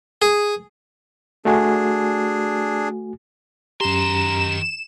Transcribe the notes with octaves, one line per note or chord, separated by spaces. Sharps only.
G#4
A3 D4 F#4 G#4 G#5
F#2 D#3 G4 A#5 C6 E7